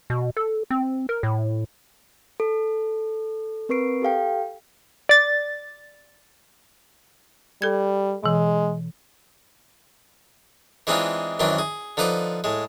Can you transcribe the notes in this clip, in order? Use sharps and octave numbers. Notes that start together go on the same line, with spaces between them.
B2
A4
C4
A#4
A2
A4
C4 A#4 B4 C#6 C7 D7
G4 A4 F5 G5
D5 A6
G3 A4 G#6
B2 E3 G#3
E3 G#3 C4 D4 D#4 F4
F#2 D#3 E3 C4 D4
G#4
D3 F3 D#4 B4 C5 D6
A2 G#3